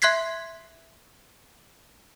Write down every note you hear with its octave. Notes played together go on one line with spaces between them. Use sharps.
E5 C6 F#6 G#6 B6 C7